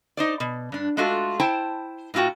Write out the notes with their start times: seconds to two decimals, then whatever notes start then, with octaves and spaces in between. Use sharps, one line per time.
0.17 D#4 C5 D5
0.40 B2
0.72 G2 D4
0.97 G#3 A3 D4 F4 F#4 A4
1.40 E4 C5 G5 A5
2.14 A2 B3 F4 F#4 G5